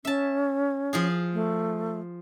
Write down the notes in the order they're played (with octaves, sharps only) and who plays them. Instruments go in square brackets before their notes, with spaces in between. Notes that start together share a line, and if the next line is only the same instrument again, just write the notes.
[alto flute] C#4 [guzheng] E5 A5
[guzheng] F3 F4 G#4
[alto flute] A3